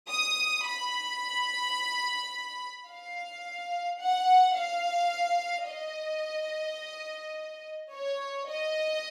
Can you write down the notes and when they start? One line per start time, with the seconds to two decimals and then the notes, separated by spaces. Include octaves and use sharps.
0.09 D#6
0.65 B5
2.89 F5
4.00 F#5
4.57 F5
5.68 D#5
7.92 C#5
8.48 D#5